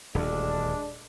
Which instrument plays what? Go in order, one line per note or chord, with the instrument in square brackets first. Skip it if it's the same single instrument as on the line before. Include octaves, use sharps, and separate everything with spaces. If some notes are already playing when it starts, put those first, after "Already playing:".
[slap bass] D#1 D2 [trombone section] G#3 D4